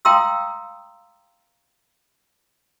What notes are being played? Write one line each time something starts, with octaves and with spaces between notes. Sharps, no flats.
F5 G5 A#5 C6 D#6 E6